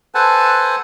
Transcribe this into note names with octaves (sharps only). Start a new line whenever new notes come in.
A4 B4 C5 F#5 G#5 A5